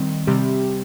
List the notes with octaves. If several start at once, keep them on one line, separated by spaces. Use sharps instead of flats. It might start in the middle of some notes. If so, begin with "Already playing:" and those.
Already playing: D#3 G3 C4
C3 G3 C4 G4